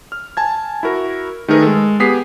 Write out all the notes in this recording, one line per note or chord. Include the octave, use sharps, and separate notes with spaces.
F6
G#5 A5 G#6
E4 F#4 A#4
D#3 A3 D#4 G#4 A#4 B4
G#3 A4
B3 G4 G#4 D#6 B6 C7